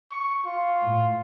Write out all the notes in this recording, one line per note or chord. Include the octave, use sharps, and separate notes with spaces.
C#6
F4
A2